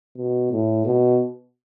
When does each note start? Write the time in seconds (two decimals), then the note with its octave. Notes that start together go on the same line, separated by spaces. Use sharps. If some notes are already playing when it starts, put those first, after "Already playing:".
0.17 B2
0.51 A2
0.86 B2